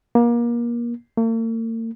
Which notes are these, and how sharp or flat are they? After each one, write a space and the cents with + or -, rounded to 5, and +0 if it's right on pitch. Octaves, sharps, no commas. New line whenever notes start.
A#3 +30
A#3 -45